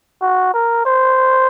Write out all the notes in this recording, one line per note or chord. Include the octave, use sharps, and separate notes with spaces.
F#4
A#4
C5